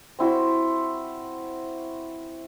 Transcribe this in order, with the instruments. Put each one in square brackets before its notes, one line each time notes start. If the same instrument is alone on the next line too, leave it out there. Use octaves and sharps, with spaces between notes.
[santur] C4 E4 F#4 C6